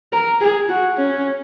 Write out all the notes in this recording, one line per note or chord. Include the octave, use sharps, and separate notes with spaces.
A#4
G#4
F#4
C#4